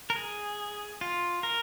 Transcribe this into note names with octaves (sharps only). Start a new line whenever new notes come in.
A#4
G#4
F4
A#4